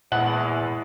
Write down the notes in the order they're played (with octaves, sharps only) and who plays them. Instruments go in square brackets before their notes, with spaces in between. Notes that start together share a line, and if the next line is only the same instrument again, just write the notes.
[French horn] E2 [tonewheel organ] A#2 A5 [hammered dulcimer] G#3 E4 [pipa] F#5